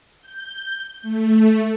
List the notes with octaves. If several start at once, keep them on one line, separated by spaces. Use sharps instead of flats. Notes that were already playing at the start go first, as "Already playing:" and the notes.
G6
A3